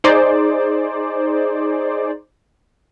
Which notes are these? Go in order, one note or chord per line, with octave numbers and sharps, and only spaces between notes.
D#4 G#4 C5 D5